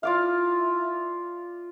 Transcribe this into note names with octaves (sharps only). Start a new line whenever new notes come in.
E4 F4 D5 F5